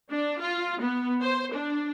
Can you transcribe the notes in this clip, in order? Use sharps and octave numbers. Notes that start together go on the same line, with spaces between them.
D4
F4
B3
C5
D4